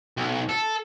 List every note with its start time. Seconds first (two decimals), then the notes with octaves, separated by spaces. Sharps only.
0.17 B1
0.49 A4